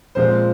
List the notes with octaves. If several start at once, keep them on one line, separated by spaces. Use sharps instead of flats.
A#2 F3 G#3 C4 C5